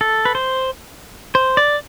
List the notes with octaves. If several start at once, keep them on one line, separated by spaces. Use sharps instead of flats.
A4
B4
C5
C5
D5